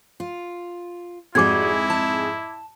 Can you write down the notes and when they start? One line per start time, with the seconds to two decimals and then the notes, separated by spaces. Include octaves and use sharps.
0.20 F4
1.35 F2 G#2 G3 E4 F#4 G#4 D6 G#6
1.90 A5